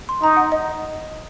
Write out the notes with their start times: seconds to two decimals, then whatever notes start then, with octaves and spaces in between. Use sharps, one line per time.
0.09 C6
0.23 D#4 A#5
0.37 F#5
0.52 D#5